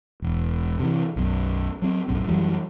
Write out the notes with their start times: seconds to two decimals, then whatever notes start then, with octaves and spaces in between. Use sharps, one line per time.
0.22 E1
0.79 C3 E3
1.16 B1 F#2
1.82 F#3 C4
2.08 D1 B1 F#2
2.26 F#2 E3 F#3 G3